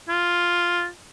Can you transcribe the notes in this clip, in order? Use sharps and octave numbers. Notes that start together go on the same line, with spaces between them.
F4